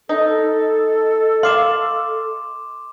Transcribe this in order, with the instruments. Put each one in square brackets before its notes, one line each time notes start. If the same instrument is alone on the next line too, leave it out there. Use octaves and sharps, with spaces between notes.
[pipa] D#4 [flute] A4
[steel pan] F5 [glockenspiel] C6 D6 E7